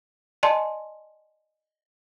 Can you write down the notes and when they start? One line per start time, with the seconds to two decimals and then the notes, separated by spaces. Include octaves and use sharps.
0.43 D5 D#5 G#5 A5 C6